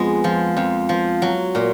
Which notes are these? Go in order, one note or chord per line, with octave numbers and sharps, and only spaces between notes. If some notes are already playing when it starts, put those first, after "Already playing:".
Already playing: F2 G#3 B3
F3
F2
F3
F#3
A#2